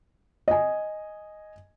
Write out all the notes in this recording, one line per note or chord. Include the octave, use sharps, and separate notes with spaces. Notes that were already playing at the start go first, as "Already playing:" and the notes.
D#5 G#5